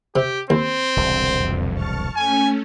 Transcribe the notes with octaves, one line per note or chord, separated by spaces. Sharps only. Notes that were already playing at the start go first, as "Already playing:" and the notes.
C3 G4
D#2 C4
E1 C2 D3
F2
A5 C#6 F6
A3 C#4 G#5